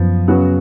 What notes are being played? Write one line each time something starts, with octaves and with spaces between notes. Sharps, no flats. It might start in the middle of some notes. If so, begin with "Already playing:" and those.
Already playing: F#2 F3 B3
C#3 F#3 B3 F#4